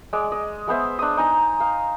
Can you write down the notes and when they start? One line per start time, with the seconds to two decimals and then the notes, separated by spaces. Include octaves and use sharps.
0.13 G#3 D5
0.32 D#5
0.68 G#3 B3 C5 E5
0.99 D4 D#6
1.17 D#4 G#5 A#5
1.60 F5